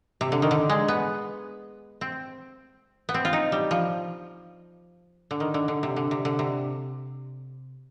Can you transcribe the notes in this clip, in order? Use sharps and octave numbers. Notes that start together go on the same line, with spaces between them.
C3
D3
D#3
D3
G#3
B3
C4
B3
C4
F4
D#4
G3
F3
D3
D#3
D3
D3
C3
D3
C3
D3
C3